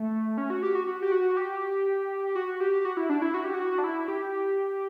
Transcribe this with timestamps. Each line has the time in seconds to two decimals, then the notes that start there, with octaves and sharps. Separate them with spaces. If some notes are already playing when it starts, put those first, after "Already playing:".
Already playing: A3
0.38 C#4
0.50 F#4
0.63 G4
0.75 F#4
0.87 F#4
1.02 G4
1.12 F#4
1.37 G4
2.35 F#4
2.60 G4
2.85 F#4
2.97 E4
3.09 D4
3.22 E4
3.34 F#4
3.44 G4
3.54 F#4
3.78 D4
3.84 E4
4.08 G4